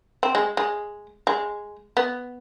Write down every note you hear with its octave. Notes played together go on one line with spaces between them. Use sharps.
C4
G#3
G#3
G#3
B3